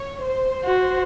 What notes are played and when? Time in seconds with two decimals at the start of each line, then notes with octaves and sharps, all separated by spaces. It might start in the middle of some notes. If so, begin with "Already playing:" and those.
Already playing: C#5
0.25 C5
0.65 F#4